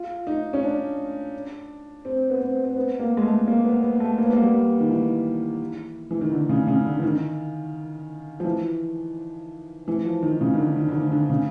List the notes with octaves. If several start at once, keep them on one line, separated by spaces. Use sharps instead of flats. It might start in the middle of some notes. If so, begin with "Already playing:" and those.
Already playing: F4
D#4
C#4
D4
C4
B3
C4
C4
B3
A#3
G#3
A3
A#3
B3
B3
A3
A#3
B3
A#3
G3
D#3
E3
E3
D#3
D3
C#3
C#3
D3
E3
D#3
F3
E3
E3
F3
D#3
C#3
D#3
D3
D#3
D3
D#3
D3
C#3